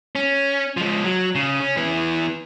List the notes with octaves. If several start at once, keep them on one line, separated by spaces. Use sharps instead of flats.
C#4
F3 G#3
F#3
C#3
C#4
E3 B3